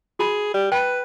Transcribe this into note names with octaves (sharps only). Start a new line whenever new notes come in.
F#4 G#4 B5
G3
B4 G5 B5